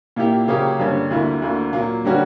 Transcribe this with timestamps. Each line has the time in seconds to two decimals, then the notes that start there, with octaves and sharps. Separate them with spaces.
0.16 A#2 A#3 E4 G4
0.48 C#3 F#3 A#3 C#4 G4
0.79 G2 D3 A#3 C#4
1.10 D2 D3 A#3 E4
1.42 D2 D3 A#3
1.73 A#2 F#3 A#3
2.04 D3 G3 A#3 C#4 F#4